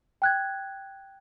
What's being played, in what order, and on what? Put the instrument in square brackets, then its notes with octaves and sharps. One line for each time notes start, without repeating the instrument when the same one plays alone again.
[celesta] G5 F#6 G#6